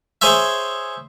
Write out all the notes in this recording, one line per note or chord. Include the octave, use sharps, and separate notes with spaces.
G#4 C5 C#5 E5